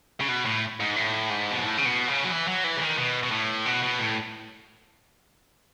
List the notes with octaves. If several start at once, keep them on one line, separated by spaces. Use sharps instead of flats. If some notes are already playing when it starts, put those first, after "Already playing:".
C#3
B2
A2
G#2
A2
G#2
B2
A2
C#3
B2
C#3
F#3
E3
F#3
E3
C#3
D#3
B2
B2
A2
B2
B2
A2